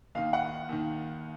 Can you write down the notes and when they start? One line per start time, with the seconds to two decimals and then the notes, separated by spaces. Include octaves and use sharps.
0.15 D#2 D#3 F5
0.33 F#5
0.69 D#2 D#3